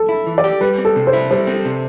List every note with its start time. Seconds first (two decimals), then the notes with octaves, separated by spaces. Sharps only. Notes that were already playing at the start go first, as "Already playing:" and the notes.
Already playing: A4
0.09 E4
0.27 E3
0.38 D5
0.44 G4
0.61 G3 B4
0.78 C4
0.85 A4
0.96 C3
1.07 C5
1.13 E4
1.31 G3 C5
1.47 C4
1.65 C3